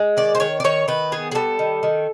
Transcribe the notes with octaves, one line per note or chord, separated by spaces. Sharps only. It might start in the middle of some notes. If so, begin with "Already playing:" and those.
Already playing: G#3
D#3 D5
C5
D#3 C#5
D5
D#3 C#5
D#3 B4
B3 G#4
G#4
G3 A4
D#3
D#3